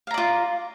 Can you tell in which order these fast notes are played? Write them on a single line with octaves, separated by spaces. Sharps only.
F5 A#5 D5 F4